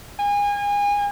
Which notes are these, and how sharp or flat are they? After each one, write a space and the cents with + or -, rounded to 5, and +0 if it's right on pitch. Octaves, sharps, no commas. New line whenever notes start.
G#5 -30